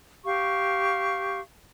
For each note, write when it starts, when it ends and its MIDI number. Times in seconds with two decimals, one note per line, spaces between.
0.24 1.40 67
0.24 1.40 77
0.24 1.40 85